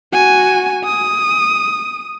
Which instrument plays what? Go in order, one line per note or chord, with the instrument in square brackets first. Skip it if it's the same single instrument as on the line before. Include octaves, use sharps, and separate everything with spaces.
[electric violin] F#4 G#5
D#6